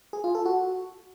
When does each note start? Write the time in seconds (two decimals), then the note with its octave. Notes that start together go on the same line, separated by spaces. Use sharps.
0.13 G#4
0.24 F4
0.35 A4
0.46 F#4